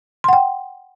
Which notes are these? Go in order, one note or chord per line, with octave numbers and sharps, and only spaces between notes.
F#5 G5 C6